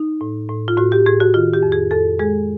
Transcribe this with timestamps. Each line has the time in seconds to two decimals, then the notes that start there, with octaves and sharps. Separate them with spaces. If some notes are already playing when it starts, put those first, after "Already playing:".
Already playing: D#4
0.21 A2
0.49 A2
0.68 F4
0.77 A2 F#4
0.92 G4
1.06 A2 G#4
1.20 F#4
1.34 D#3 F4
1.53 G4
1.63 F2
1.72 G#4
1.91 F2 A4
2.19 G#3 G#4